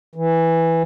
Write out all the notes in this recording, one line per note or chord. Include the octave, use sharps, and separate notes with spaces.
E3